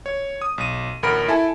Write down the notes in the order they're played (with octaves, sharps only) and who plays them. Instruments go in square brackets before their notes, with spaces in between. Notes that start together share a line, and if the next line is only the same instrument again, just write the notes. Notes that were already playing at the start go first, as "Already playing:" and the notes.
[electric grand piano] C#5
D#6
B1 D#7
A1 D2 A#4 B5 D7
E4 A4 G#5 A5